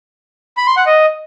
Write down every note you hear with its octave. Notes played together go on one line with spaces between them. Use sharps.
B5
C6
F#5
D#5